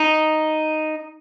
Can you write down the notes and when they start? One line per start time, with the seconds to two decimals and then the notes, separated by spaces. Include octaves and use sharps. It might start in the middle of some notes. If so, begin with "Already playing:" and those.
Already playing: D#4